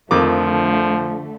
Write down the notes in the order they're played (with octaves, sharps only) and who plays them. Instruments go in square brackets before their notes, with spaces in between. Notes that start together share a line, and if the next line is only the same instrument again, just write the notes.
[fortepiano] F2 D#3 D6 [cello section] D3 A3 [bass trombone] F3